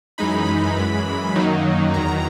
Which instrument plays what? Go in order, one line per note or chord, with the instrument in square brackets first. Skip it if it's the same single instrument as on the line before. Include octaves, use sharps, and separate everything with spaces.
[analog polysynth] F#2 E3 G#3 D#4 B5
F#2 E3 G#3
F#2 D#3 F#3 A#3 D#4
E2 D#3 F#3 A#5
A#5